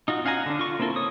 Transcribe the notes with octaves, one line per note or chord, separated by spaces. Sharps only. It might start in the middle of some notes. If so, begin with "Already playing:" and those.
D#4 F4 F#4
C#4 F5 F#5 G#5 A#5
D3 D4
F4 C#6
A#3 C4 E4 A4 A#4
C#5 D#6